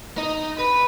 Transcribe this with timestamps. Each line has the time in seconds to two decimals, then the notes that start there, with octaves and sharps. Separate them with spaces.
0.18 D#4
0.59 B4